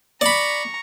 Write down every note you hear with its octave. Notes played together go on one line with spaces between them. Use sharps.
D5 A#5 B5 C#6